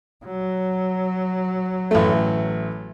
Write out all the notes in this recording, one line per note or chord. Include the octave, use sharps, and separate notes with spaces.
F#3
A1 A3